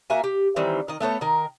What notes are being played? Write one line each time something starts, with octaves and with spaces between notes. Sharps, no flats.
A#3 F#4 E5 G#5
G4
D#3 E3 G3 C4
D#3 D#5
A3 B3 A4 C#5
D#3 A#4